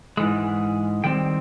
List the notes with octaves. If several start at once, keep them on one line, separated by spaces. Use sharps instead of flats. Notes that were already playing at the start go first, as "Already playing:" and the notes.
G#2 E3 G#3
D#3 G3 C4 G5